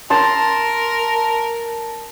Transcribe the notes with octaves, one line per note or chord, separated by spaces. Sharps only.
A#4 A5 C6